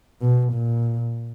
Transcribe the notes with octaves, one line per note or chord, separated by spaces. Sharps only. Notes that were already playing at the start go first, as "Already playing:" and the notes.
B2
A#2